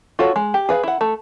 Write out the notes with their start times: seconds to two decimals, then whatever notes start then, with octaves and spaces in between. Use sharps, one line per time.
0.19 F4 F#4 A4 C#5
0.36 G#3
0.54 G4
0.69 G#4 B4 F5
0.83 E4 F#5
1.01 A3